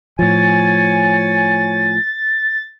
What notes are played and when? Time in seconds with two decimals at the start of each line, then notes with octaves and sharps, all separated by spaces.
0.19 A2 F3 C#5 G#5 A6